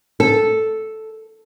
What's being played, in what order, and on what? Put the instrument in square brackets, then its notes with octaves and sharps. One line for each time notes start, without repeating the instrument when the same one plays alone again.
[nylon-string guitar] A4